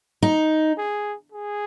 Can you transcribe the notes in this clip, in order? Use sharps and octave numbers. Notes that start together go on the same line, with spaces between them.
D#4
G#4
G#4